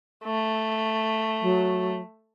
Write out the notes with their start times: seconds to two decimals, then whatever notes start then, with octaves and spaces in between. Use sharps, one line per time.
0.25 A3
1.41 F#3